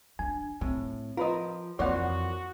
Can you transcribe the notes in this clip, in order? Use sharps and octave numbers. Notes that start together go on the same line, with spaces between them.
D4 G#5
A2 C4
F3 F4 A#4 B4 D#5
F2 E3 F3 A#3 F#4 C#5 D5 F#5